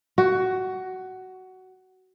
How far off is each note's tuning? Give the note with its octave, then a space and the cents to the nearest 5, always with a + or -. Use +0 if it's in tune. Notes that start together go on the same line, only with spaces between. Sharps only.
F#4 +15